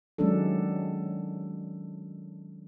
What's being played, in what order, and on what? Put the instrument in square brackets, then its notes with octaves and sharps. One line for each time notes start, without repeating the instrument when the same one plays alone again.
[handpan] D#3 F#3 G#3 C#4 D4 A4